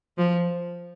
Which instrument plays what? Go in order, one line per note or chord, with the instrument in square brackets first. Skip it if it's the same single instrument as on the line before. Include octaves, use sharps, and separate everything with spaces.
[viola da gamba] F3